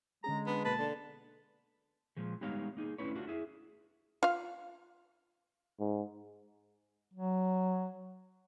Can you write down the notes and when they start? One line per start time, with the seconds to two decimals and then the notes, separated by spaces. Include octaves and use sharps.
0.24 D3 G#3 C#4 G#4 A#5
0.46 B3 D4
0.65 B2 A#3 B4 A5
0.78 D3
2.17 A#2 F3 G#3
2.41 G3 G#3 B3 D#4 C#5 F5
2.77 A#3 D#4 F4 G#4
2.98 A3 C#4 D4 E4 B4 C#5
3.15 A3 D4 F4 F#4
3.27 E4 G#4 E5
4.23 F4 F5
5.80 G#2
7.14 F#3